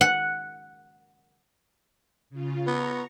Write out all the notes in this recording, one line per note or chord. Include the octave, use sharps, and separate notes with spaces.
F#5
C#3 F4
B3 A#5 C#6